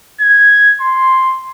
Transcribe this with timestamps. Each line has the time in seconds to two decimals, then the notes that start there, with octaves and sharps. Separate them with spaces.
0.21 G#6
0.81 C6